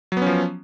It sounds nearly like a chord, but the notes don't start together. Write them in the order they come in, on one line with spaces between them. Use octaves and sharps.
F#3 B3 C#4 F3